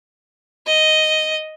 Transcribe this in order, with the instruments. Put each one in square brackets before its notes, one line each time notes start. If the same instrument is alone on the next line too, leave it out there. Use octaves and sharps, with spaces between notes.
[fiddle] D#5